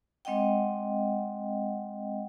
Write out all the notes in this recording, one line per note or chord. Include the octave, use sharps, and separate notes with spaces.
G#3 C4 D#5 F#5 G5